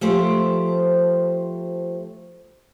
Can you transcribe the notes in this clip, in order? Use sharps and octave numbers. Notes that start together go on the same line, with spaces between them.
F3 A3 G4 C5